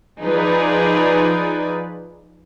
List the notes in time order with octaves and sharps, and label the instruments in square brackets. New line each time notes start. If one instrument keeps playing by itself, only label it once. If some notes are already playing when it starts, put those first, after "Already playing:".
[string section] F3 D#4 F4 G#4 B4 D5